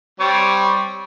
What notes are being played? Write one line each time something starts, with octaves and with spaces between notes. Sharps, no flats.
G3 C4 C#5